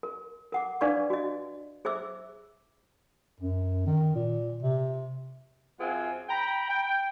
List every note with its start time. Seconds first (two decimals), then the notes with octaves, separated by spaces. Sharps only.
0.03 A#4
0.52 A#4 F#5 D6
0.81 D4 B4 D5 F5 C#6 D6
1.10 F#4 D#5
1.85 G#4 C5 E5 D6 E6
3.41 F#2
3.87 D#3
4.15 A#2
4.63 C3
5.80 F#2 C4 F4 G#4 F#5 G#5
6.29 G5 A#5 B5
6.70 G5